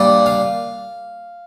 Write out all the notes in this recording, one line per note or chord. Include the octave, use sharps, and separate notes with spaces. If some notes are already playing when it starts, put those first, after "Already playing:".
Already playing: A#2 G3 D4 D5
F5